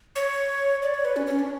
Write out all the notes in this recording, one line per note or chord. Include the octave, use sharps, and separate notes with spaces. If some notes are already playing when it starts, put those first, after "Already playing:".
C#5
D5
C#5
B4
C#4
C#4
D4